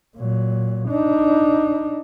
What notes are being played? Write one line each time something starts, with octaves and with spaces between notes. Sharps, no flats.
A#2 F#3
D4 D#4